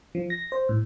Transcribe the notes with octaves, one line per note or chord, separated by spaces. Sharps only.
F3
A#6
C5
A2